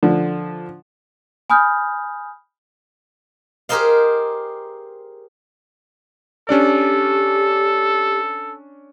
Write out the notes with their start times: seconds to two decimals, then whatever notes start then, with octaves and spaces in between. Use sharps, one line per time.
0.03 D3 F3
1.50 G#5 B5 D#6 F6 G6
3.69 G4 G#4 A#4 C5 D#5 F5
6.49 C#4 D4 G4 A4 D5